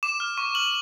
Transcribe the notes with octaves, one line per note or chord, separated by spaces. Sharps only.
D6 E7
F6
C#6
F6 F#7